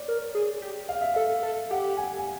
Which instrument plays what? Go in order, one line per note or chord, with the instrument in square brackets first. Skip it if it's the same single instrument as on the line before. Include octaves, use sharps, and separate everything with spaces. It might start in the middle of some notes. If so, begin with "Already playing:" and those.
Already playing: [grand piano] C#5 D5
[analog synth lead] A#4
G#4
G4
[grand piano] F5
E5
[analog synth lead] A4 [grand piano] F5
[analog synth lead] A4
[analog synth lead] G4 [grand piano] F#5
[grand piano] G#5
G#5